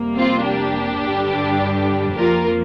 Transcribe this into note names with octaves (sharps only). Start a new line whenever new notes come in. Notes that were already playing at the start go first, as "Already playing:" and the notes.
Already playing: F2 C3 G3 A#3
C4 F4
D4 G4
G2 D3 G3
F2 F3 A#3 F4 A#4